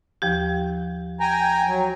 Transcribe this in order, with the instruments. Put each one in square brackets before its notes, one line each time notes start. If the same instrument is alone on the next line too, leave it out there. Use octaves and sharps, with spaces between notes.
[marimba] D#2 F3 G4
[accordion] G5 G#5 A#5
F#3